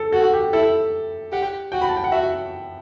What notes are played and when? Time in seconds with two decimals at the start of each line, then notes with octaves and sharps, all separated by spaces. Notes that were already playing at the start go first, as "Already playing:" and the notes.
Already playing: A4
0.12 F#4 A4
0.33 G4
0.53 E4 A4
1.32 G4 F#5
1.72 F#4 G5
1.82 B5
1.89 A5
1.97 G5
2.04 F#5
2.12 F#4 E5